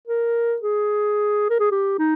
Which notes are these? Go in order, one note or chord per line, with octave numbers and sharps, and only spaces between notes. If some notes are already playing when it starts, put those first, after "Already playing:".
A#4
G#4
A#4
G#4
G4
D#4